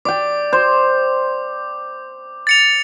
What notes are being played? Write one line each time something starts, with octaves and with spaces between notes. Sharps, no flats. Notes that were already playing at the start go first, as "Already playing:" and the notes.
D5 G5 D6
C5
A6 C#7 F7